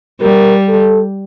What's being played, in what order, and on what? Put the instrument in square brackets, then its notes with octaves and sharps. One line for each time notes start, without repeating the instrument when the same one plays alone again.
[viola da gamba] G3 [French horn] A#4
[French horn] A4